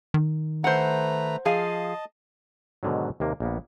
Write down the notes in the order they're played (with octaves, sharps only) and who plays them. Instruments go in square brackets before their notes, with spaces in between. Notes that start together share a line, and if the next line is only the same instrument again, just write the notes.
[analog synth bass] D#3
[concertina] A3 B4 A#5 [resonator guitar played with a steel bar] C5 F#5
[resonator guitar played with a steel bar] F3 G#4 F5 [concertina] D#5 A5
[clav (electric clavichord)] G#2 B2 D3 D#3 F#3
D#2 C3 A#3
A#1 A#3 B3